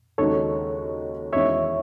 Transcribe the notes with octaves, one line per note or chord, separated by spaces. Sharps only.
D#2 C#3 G#3 D#4 F#4 A4 C#5
E2 D#3 G#3 C#4 F#4 C#5 E5